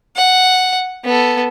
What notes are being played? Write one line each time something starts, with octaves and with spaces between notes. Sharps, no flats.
F#5
B3 A4